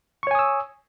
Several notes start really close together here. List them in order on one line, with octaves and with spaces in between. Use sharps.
C#6 C#5 G#5 D#6 E6